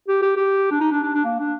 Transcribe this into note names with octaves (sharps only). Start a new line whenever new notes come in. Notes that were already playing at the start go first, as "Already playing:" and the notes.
G4
G4
G4
D4
D#4
D4
D4
D4
A#3
D4